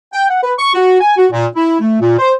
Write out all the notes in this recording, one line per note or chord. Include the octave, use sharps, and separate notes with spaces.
G5
F#5
B4
C#6
F#4
G#5
F#4
A#2
E4
A3
A#2
C5